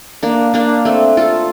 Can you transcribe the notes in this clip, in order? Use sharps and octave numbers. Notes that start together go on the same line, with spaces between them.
A#3 D4
A#3 D4
A3 C4
F4 A4